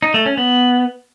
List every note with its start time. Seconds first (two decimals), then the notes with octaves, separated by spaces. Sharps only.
0.02 D#4
0.14 A3
0.26 C#4
0.37 B3